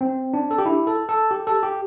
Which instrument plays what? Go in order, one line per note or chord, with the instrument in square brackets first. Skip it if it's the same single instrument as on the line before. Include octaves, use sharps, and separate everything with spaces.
[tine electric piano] C4
D4
A4
G4
E4
A4
A4
G4
A4
G4